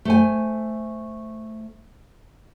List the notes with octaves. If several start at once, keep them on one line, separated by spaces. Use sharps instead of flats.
A3 C5 G#5